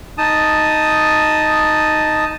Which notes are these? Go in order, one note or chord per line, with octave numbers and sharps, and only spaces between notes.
D#4 A5 D#6